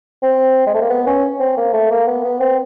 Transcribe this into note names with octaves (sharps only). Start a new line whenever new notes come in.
C4
G#3
A3
A#3
B3
C#4
C4
A#3
A3
A#3
B3
B3
C4